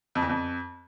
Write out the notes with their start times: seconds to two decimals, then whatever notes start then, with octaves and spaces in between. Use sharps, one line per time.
0.15 F2
0.22 E2
0.29 F2